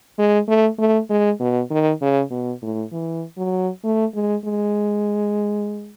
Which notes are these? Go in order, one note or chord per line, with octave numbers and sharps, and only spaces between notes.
G#3
A3
A3
G#3
B2
D#3
C#3
B2
A2
E3
F#3
A3
G#3
G#3